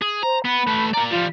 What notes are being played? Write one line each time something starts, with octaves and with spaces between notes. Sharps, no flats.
G#4
C5 A#5
B3 B5
A3 B4
A#3 D5 A#5
F3 G3 F4